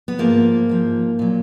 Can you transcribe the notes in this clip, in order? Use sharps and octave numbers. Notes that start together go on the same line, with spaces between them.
B3
G#2 F3 A#3
G#2 F3
A#2 F#3